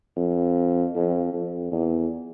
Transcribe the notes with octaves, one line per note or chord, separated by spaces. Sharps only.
F2
F2
F2
E2